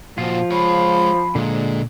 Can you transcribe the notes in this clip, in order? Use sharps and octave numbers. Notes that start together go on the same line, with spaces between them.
A#2 F3 F4 F#4
G#3 C#5 B5
A#2 D3 G#3